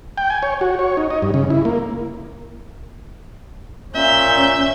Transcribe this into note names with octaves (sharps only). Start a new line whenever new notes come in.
G5
G#5
C#5
F#4
C#5
D#4
D#5
G2
C#3
E4
A#3
A#2 C#4 E5 G6